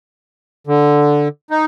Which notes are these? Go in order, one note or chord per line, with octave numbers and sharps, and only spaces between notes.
D3
D#4